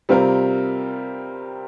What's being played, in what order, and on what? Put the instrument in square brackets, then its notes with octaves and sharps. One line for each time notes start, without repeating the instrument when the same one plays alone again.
[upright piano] C3 G3 C4 F4 A#4